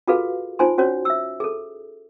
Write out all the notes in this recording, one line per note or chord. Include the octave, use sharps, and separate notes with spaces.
F4 F#4 G#4 A4 B4 F5
D#4 F4 C5 G#5 C6
C#4 F#4 C5 C#5
E5 E6
G#4 A4